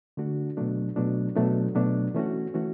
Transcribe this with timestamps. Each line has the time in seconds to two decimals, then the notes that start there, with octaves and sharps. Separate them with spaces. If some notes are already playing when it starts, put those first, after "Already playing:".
0.17 D3 A3 D4 F#4
0.57 B2 F#3 A3 D4
0.96 B2 F#3 A3 D4
1.36 B2 F#3 A3 D4
1.75 B2 F#3 A3 D4
2.15 E3 A3 C#4 F#4
2.54 E3 A3 C#4 F#4